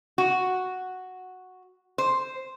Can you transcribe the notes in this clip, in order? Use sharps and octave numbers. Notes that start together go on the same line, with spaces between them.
F#4
C5